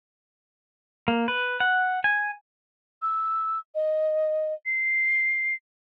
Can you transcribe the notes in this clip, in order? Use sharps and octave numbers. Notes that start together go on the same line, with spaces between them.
A#3
B4
F#5
G#5
E6
D#5
C7